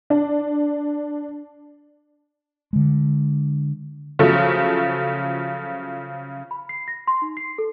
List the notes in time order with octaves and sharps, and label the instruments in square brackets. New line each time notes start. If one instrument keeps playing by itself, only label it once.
[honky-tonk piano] D4
[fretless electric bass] D3 G#3
[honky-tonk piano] C#3 F3 F#3 A3
[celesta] B5
C7
A#6
C6
D#4
C7
A4